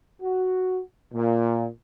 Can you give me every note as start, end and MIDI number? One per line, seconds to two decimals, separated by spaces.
0.22 0.81 66
1.14 1.67 46